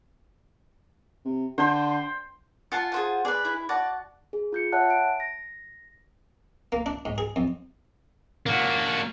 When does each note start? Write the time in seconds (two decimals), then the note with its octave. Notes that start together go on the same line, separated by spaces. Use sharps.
1.25 C3
1.58 D3 C5 G5 C6
2.72 F4 F#5 G#5 A5
2.92 G#4 C5 F#5
3.25 G#4 B4 D5
3.45 E4
3.69 F#4 D5 A5
4.33 G#4
4.52 F4 G6 C#7
4.72 C#5 E5 F#5 A5 F#6
4.90 D7
5.20 A#6
6.72 A#3
6.86 D4
7.05 G#2
7.18 G#4
7.36 F2
8.46 A#3 F#4